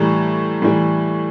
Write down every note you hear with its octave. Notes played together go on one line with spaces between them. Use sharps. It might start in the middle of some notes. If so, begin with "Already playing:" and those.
Already playing: A2 E3 G3 A#5
A2 E3 G3